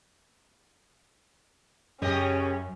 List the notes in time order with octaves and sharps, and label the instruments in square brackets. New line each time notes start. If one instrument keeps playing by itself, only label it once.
[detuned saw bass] F#2 [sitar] C#3 G4 D#5 [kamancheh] C#4